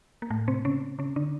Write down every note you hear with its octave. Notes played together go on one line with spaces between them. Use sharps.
A#3
A2 A3
C3 C4
C#3 C#4
C#3 C#4
D3 D4